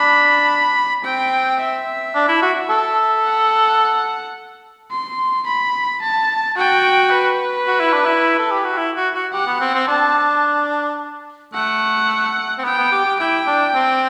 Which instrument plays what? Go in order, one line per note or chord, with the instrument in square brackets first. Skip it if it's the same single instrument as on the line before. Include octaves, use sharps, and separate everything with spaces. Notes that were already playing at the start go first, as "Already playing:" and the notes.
Already playing: [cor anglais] D4 [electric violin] B5
[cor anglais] C4 [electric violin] G5
[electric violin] E5
[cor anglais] D4
E4
F#4
A4
[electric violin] F#5
C6
B5
A5
[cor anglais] F#4 [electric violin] G5
[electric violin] B4
[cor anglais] F#4
E4
D4
E4
A4
G4
F#4
E4
F#4
F#4
[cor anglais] G4 [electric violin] F#5
[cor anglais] B3
C4
C4
[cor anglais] D4 [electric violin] A5
[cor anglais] A3 [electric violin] F#5
[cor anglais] C4
[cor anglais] B3 [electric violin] G5
[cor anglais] B3
G4
G4
[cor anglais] E4 [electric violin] G5
[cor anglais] D4
C4